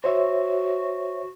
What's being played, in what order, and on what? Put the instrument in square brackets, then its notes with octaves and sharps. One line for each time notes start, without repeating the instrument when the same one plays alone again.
[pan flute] F#4 [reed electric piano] C5 C#5 E5